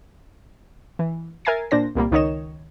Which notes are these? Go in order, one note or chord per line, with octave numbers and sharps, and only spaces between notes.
E3
A#4 E5 G#5 G#6 A6 C7
A#2 D4 C5 A#6
C2 A#2 G3 A#3
C#2 D#3 D#4 C#5 D#5 E7